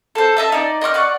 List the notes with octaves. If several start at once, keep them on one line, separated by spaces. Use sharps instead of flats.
A4 C5
D#5 E5 A5
D#4 D5
D#5 G5 C#6 F6
D5 F#5 C#6